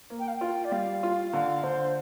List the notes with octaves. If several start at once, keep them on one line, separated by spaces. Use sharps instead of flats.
A#3
G5
F5
F4 G5
D5
G3 F5
F4
D3 F5
D3 C5